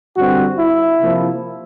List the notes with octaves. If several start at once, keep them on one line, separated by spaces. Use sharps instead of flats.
G2 D3 G3 C4 F#4
E4
C3 F3 A#3